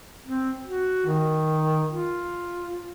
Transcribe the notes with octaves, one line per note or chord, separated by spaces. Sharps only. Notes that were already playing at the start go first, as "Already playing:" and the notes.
C4
F#4
D#3
F4